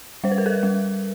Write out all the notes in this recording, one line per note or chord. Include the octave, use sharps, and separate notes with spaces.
G3 C5
B4
A#4
A4 B4
G3